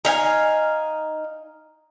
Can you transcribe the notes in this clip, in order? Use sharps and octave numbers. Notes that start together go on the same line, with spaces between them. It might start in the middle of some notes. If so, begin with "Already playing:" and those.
D#4 F5 G#5